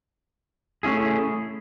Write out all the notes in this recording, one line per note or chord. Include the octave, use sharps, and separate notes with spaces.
A3 C#4 E4 G#4